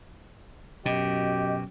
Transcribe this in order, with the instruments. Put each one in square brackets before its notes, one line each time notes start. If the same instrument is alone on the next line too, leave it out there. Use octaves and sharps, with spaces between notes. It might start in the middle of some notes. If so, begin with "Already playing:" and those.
[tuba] F#2 [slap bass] B2 [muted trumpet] G4 [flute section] D#5